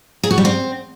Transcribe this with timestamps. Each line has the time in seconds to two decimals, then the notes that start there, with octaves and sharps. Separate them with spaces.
0.23 G#4
0.31 F#4
0.38 G3
0.45 C4